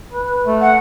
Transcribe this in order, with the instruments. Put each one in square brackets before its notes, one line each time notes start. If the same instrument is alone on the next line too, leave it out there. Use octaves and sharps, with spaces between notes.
[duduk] B4
A3
[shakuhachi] F#5